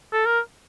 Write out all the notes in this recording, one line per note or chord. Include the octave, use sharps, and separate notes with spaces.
A4
A#4